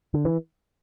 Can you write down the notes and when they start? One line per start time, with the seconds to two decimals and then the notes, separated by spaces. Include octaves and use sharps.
0.14 D3
0.25 E3